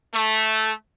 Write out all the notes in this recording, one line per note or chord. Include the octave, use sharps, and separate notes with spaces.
A3